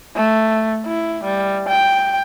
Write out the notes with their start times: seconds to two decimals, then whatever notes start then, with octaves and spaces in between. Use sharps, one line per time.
0.16 A3
0.85 E4
1.23 G3
1.68 G5